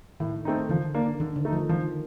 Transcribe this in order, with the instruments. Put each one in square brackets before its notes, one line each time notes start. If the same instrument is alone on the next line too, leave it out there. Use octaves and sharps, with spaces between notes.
[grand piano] A2 [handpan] D#3
[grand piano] A3 C4 D#4
[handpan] D3 [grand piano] F3
[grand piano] A#3 D4
[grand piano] D3 [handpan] D#3
[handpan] D3
[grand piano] A3 D#4
[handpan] F3
[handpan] D#3 [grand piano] F3